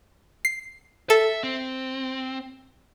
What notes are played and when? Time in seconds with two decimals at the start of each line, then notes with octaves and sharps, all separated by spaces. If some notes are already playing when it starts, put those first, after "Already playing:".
0.45 C7
1.10 A4 E5
1.43 C4